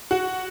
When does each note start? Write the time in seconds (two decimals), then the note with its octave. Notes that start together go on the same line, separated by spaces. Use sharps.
0.11 F#4